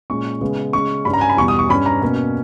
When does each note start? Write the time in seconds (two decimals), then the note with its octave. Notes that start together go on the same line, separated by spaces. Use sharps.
0.10 A#2 G#3 C#4 C#6
0.41 C#3 G#3 B3
0.73 C#3 G#3 C#4 C#6
1.05 G2 G3 C#4 B5
1.13 A#5
1.21 G#5
1.29 B5
1.37 E2 B2 G3 C#6
1.48 D#6
1.59 C#6
1.69 G2 G3 C#4 B5
1.86 A#5
2.02 B2 A#3 C#4